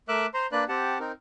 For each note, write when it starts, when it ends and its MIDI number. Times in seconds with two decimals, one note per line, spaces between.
0.09 0.26 57
0.09 0.26 70
0.09 0.26 76
0.09 0.26 86
0.09 0.26 88
0.09 0.26 90
0.34 0.47 72
0.34 0.47 82
0.34 0.47 84
0.52 0.64 58
0.52 0.64 62
0.52 0.64 71
0.52 0.64 74
0.52 0.64 90
0.69 0.98 60
0.69 0.98 67
0.69 0.98 78
0.69 0.98 81
1.00 1.12 60
1.00 1.12 63
1.00 1.12 70